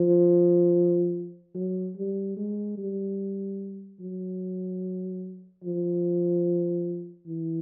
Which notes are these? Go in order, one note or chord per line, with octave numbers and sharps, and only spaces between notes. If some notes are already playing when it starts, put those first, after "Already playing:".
Already playing: F3
F#3
G3
G#3
G3
F#3
F3
E3